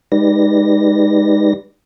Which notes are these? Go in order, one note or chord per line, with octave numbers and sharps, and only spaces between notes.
G#3 D#4 G4 B4 D5 A#6